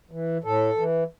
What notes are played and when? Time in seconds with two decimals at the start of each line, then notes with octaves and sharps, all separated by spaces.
0.11 E3
0.44 A2 A4
0.77 E3